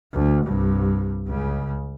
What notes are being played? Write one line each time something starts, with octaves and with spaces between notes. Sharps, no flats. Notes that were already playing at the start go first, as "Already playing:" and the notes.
D2
C2 G2
C#2 C#3